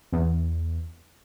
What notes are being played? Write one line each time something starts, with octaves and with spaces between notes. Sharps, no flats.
E2